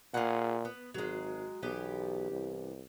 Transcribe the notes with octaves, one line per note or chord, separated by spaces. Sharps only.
A#2 F4 G#4 F#5
B3
G#1 F#3 G#3
B1 E3 B3 G4
C2